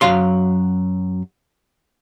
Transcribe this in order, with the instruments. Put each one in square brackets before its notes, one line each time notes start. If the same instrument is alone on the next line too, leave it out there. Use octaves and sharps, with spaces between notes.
[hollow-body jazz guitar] F#2 F#3 F5 C6